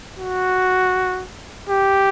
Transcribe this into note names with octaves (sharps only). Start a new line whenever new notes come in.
F#4
G4